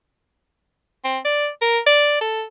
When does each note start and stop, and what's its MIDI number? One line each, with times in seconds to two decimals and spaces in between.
1.05 1.19 60
1.25 1.48 74
1.62 1.79 70
1.87 2.17 74
2.21 2.43 69